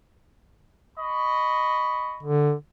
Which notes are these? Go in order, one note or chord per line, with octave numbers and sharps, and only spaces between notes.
D#5 B5 C#6
D3